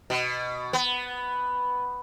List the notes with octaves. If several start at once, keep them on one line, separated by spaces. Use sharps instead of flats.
B2
B3